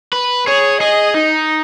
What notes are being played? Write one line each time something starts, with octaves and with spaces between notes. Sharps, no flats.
B4
G#4 C#5
G#4 D#5
D#4